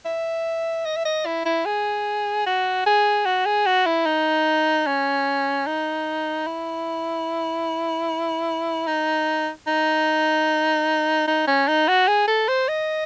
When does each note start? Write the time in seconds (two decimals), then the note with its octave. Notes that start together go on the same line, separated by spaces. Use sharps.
0.05 E5
0.86 D#5
0.97 E5
1.05 D#5
1.26 E4
1.45 E4
1.66 G#4
2.46 F#4
2.86 G#4
3.26 F#4
3.46 G#4
3.66 F#4
3.86 E4
4.06 D#4
4.87 C#4
5.66 D#4
6.47 E4
8.87 D#4
9.67 D#4
11.28 D#4
11.47 C#4
11.68 D#4
11.88 F#4
12.08 G#4
12.28 A4
12.48 C5
12.68 D#5